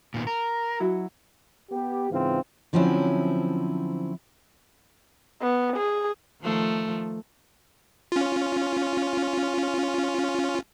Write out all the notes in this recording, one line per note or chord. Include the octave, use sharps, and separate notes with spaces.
A#2 D#3 B3
A#4
F#3 E4 F#4
B3 G4
G#2 C#3 E3 C4 F4
D3 F3 F#3 C4 C#4 E4
B3
G#4
D#3 F3 A3
C#4 F4